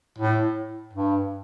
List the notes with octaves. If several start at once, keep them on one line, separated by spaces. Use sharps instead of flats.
A2
G2